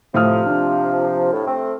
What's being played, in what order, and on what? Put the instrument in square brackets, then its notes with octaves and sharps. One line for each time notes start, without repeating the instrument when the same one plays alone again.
[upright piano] A2 D#6 F6 [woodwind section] C3 F3
[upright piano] D4
[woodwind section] A2
A3 C4